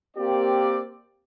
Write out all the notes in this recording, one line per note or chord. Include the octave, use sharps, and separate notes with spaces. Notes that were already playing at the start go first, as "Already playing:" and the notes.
A#3 C4 G4 D5